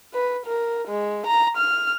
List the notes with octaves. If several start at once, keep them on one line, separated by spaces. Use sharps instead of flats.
B4
A#4
G#3
A#5
F6